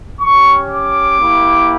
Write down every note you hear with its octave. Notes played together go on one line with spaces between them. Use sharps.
C#4 G4 C#6
D6
A#3 E4 G4